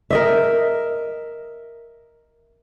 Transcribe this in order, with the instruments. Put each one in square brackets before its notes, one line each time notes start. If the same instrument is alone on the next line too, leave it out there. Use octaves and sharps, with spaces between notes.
[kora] A#4 D#5 E5